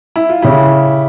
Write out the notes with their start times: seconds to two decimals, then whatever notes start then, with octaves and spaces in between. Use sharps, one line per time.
0.16 E4
0.29 F4
0.42 C#3 E4 G4